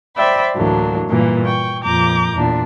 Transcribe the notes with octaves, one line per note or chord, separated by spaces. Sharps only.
C5 D5 E5 G5 B5
D2 A2 E3 F#3 A#3 D4
G2 A#2 E3 A#3
G5 C#6
F2 A#2 A#5 D6 G6
E2 A#2 D4